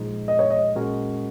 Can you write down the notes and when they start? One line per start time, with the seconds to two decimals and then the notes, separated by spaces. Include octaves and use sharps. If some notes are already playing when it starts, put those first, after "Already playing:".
Already playing: A#2 F3 G#3 D#4
0.28 D#5
0.39 C#5
0.50 D#5
0.76 A#2 G#3 C#4 F#4 A#4